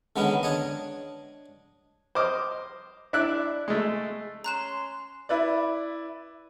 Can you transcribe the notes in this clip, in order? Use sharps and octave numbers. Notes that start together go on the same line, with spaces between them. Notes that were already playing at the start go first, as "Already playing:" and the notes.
D3 D#3 G#3 B3 C#4
D4 C#5 D#5
C5 D#5 D6 F6
D4 E4 D5 E5 F#6
G#3 A3
C#4 A#5 C6 F#6 E7
E4 B4 D5